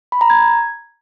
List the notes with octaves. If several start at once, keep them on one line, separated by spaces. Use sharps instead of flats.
B5
A#5
G#6